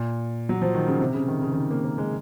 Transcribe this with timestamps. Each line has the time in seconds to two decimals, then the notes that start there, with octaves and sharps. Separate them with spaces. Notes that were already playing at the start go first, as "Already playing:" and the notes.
Already playing: A#2
0.49 F#3
0.62 F3
0.74 D#3
0.88 C#3
1.00 C3
1.14 C#3
1.28 D#3
1.42 C#3
1.52 D#3
1.56 C#3
1.71 A#3
1.84 A#3
1.98 G#3